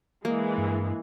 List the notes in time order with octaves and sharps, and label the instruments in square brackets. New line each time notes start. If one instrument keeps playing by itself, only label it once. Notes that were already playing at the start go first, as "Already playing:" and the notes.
[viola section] E3 G#3 [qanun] A#3
[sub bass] G2